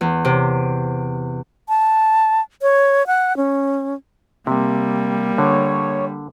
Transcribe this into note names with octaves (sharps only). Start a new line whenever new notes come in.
E2
C3
A5
C#5
F#5
C#4
C3 G3 A#3
D3 C#5